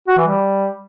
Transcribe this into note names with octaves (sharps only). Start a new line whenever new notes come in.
F#4
E3
G3